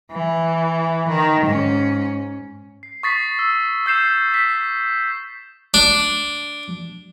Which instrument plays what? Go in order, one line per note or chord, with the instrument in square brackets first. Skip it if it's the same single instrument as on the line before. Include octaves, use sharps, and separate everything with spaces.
[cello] E3
D#3
G#2 C#4
[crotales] C7
C#6 D#6 A6 B6 C7
E6
E6 G6 C7 E7
B6
[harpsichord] D4